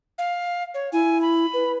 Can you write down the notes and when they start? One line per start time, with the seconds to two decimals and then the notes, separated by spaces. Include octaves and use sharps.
0.18 F5
0.74 C#5
0.93 E4 G#5
1.22 B5
1.54 B4